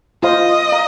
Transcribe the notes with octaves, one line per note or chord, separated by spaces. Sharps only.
F4 C5 D#5 F5 C6
F5 A#5